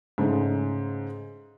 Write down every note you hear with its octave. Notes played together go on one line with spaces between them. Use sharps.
G#2 C#3 G#3 A3 D#4